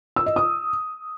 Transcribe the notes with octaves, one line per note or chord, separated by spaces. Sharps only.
E6
D#5
D#6